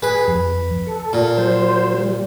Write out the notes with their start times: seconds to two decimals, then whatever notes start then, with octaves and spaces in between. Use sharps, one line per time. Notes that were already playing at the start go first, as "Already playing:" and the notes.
0.02 G#4 B4
0.28 F2
0.87 A4
1.13 A#2
1.37 F#3 C5
1.99 G3